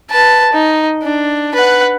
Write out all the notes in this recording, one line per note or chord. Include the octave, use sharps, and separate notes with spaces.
B4 A5
D#4
D4
B4 F#5